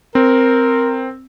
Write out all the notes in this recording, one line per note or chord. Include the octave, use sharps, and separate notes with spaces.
C4 A#4